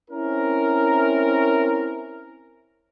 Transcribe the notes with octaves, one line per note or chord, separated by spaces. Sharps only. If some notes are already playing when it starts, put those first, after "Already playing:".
C4 C#4 E4 A#4